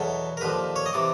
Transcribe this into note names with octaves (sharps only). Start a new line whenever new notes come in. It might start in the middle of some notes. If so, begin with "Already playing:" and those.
Already playing: E2 B2 F#3 A4
A#4
D#2 D3 F3 B4
C#5
D#5
C3 E3 D5